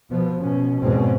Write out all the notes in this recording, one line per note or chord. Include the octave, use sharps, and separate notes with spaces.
B2 F3 B3
B2 C#4
E2 G#2 B2 D3 C4 C#4